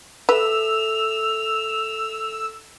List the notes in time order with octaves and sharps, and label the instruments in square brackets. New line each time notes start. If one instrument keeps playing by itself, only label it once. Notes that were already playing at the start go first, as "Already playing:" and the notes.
[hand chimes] A4 E5 [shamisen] B4 [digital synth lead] E6 [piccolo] F7